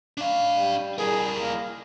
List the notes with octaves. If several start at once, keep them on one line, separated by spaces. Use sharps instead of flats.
D4 F5
G3
E4 G#4 A#4
A#3